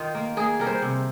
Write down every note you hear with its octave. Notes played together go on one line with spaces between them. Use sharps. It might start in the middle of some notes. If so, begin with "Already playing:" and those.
Already playing: D#3 D#4 F4
A#3
A#3 G#4
G3 A#4
C5
C3